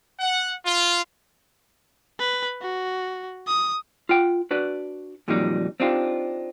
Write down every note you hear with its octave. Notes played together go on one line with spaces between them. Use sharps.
F#5
F4
B4
F#4
D#6
F4 F#5 G5
D4 F#4 B4 D5
F2 A#2 D#3 F#3 G3 D#4
C4 D4 D#4 F4 G4